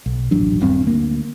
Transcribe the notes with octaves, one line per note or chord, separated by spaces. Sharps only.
B1
D#1 A1 F#3 D4
D#1 G2 C4
D2 A#3